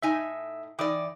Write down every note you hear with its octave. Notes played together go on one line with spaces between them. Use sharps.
A2 D#4 E5 G#5
E3 D#4 D5 G5 D6 D#6